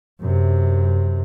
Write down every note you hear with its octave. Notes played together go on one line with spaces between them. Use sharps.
F#2 C3